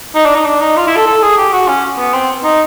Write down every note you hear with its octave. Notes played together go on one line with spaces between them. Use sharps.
D#4
D4
D#4
D4
D#4
F4
E4
A4
A4
G#4
G4
F#4
C#4
B3
C4
D#4